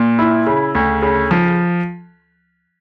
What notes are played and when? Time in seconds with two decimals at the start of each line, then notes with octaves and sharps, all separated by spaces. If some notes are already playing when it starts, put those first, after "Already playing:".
Already playing: A#2
0.19 E4
0.47 C#3
0.75 D2
1.02 C#3
1.31 F3